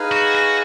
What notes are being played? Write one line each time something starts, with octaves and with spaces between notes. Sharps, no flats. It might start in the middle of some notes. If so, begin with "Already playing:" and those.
Already playing: D#4 G#4 B4 F5 G#5
F#4
F#4